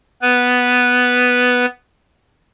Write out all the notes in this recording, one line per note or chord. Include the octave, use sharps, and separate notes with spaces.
B3 B4